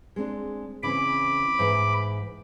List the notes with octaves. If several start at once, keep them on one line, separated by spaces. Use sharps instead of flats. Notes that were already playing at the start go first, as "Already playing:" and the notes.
G#3 C4 D4
C#3 E3 C4 B5 D6
G#2 E3 F#5